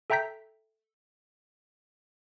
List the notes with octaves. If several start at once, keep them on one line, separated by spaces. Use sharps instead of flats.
A4 E5 G5 A#5 G6 B6